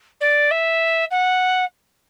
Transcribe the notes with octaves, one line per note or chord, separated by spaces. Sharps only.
D5
E5
F#5